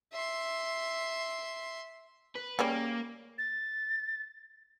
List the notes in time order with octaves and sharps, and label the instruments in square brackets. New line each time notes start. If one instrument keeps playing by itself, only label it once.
[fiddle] E5 C6
[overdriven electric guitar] B4
[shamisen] C#3 G3 C#4 [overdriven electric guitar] A#3
[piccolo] A6